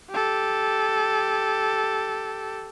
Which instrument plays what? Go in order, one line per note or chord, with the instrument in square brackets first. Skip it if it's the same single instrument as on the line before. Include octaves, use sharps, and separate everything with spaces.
[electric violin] G4 A4